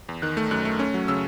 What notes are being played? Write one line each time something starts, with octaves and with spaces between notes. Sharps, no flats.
E2
D#3 F#6
A3
F#2 F#6
A3
C#4
F#3
C#3 E6